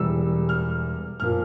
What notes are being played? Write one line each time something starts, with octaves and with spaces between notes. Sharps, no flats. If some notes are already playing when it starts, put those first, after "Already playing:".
Already playing: E1 E2 E3 G3 E6
F6
A#2 F3 F6